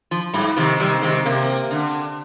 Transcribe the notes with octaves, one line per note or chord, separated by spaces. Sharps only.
F3
G#2 G3
C3 D#3 F3
C3 D#3 G3
C3 D#3 G#3
C3 A#3
D3